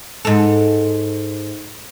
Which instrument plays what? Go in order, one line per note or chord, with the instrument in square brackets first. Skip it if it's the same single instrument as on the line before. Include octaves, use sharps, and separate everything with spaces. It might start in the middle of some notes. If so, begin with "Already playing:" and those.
[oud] G#2 A4